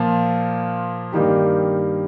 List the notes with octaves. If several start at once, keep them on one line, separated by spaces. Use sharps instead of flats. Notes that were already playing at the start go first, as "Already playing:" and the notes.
Already playing: A#2 F3 A#3 F4
G2 D#3 A#3 D#4 G4